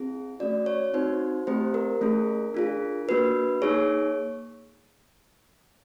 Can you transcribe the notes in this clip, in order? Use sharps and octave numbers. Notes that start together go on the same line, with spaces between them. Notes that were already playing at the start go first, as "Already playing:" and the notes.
Already playing: C4 E4 G#4
A3 C#4 F#4 D5
C#5
C4 D#4 F#4 C5
A3 C4 E4 G4 C5
A#4
A3 C#4 E4 G#4
D4 F4 G#4
A#3 D4 F#4 B4
A#3 D#4 G#4 C#5